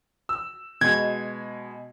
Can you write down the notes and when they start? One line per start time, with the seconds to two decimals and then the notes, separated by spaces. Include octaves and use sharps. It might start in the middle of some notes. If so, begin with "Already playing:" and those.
0.29 E6
0.81 B2 G#3 G#6